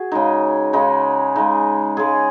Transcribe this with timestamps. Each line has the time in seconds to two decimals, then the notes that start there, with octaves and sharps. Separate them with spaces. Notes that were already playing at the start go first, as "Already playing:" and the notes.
Already playing: F#4 G#4
0.12 C#3 G#3 D#4
0.73 C#3 G#3 D#4
1.36 C#3 G#3 D#4
1.97 C#3 G#3 G#4